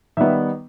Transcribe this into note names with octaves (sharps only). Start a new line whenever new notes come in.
D#3 G3 B3 E5